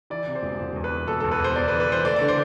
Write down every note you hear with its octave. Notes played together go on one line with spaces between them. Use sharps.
E3 D5
C3
C5
E1
E1 C5
E2
B4
E3
E1 A4
E2 A4
B4
E2 C5
E2 D5
B4
E3
B4
E3 C5
A3 D5
D5
D3
C5